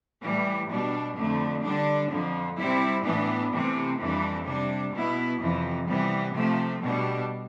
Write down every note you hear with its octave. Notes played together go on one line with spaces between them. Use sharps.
A2 E3 G3
B2 G3 D4
F2 D3 A3
D3 G3 D4
F2 D3 F3
C3 G3 C4 E4
A2 E3 B3 D4
C3 E3 A3 C4
F2 E3 G3 D4
C3 G3 D4
B2 B3 E4
F2 C3 E3
C3 E3 G3 B3
C3 F3 A3
B2 G3 D4